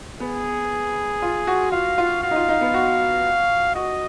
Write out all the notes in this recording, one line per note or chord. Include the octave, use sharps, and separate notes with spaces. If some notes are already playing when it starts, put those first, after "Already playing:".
B3 G#4
F4
F#4
F4 F5
F4
F#4 F5
D#4
F4
D#4
B3
F#4
F#4 D#5